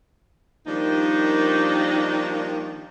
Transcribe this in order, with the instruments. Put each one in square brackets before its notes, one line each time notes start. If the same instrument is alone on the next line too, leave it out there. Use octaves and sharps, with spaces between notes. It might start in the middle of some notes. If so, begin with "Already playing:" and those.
[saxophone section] D#3 F3 G3 A#3 D4 D#4